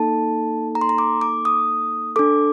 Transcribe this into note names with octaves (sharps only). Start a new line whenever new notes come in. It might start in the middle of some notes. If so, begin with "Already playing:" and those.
Already playing: A#3 D#4 A4 A5
A#5
C6
A#5
D6
D6
D#6
D4 A4 D6